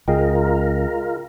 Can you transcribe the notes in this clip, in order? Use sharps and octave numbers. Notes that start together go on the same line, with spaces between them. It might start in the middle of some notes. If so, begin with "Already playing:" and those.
C#2 F4 G#4 A#4 D#5 G5